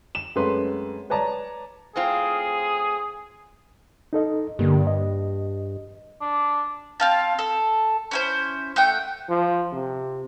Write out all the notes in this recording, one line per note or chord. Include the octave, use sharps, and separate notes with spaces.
E7
F#2 G#3 A3 C4 B4 C6
B4 C#5 D5 A5 A#5
A2 C4 F4 G#4
D#4 A4 D#5
G2 D3 A#3 G4
D#5
D4
C4 F5 A5
A4
C#4 E4 C5
A3 F#5 G5
F3
C3